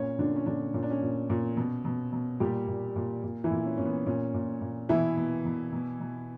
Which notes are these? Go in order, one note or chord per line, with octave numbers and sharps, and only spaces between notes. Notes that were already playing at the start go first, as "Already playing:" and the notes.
Already playing: A#2 C#4 C#5
A#2 D3 D4
C#4
A#2 D3 D4
A#2 C#4
D4
C#4
A#2
A#2
B2
B2
B2
A#2 G3 G4
A#2
A#2
A#2
E3 E4
A#2
C#4
A#2 C#4
B3
A#2 C#4
A#2
A#2
B2 E3 E4
B2
B2
B2
B2